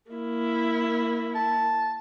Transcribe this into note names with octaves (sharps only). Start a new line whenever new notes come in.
A#3 E4
A5